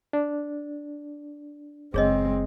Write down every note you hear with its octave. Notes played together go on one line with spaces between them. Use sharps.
D4
F#1 G#3 C4 G#4 C#5 D#5